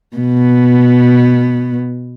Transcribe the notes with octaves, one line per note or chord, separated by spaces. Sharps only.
B2 B3